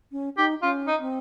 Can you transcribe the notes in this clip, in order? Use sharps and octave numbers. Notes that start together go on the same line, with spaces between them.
C#4
D#4 G4
C#4 F4
D#4
C4